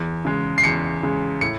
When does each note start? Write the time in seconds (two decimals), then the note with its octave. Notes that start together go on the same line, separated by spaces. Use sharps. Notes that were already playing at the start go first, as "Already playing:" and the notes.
Already playing: E2
0.25 C#3 G#3
0.58 C7
0.64 E2 C#7
1.03 C#3 G#3
1.41 A2 C#7